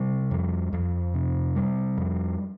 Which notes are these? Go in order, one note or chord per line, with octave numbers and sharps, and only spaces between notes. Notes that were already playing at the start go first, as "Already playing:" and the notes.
Already playing: C3 G3
F2
F2
C3
G3
F2